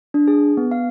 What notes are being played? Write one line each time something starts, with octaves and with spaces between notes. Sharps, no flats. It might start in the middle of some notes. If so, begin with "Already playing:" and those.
D4
G#4
B3
F5